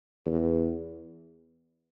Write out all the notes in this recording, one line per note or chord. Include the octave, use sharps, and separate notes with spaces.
E2